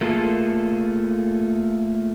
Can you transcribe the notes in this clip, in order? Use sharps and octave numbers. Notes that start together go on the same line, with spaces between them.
A3 A#3 F4 G#4 A4